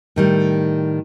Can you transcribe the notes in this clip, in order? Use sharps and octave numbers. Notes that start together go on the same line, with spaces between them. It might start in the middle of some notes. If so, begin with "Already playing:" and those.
A2 D#3 G3